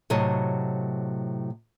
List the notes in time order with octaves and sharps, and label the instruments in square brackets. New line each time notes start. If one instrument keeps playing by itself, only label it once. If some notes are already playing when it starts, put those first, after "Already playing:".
[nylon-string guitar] A2 C3 F#3 D#5 A5